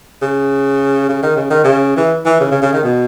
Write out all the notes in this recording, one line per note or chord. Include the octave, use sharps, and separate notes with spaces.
C#3
C#3
D#3
C#3
D#3
C#3
E3
E3
C#3
C#3
C#3
D#3
B2